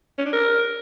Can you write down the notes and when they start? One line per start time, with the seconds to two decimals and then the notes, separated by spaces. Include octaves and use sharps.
0.18 C#4
0.25 D4
0.33 A#4